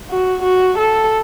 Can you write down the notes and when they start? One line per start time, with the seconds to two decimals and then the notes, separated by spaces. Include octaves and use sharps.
0.10 F#4
0.42 F#4
0.78 A4